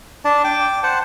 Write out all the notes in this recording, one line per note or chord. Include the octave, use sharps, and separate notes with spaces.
D4 D5 A5
G5 D6
C5 F#5 A5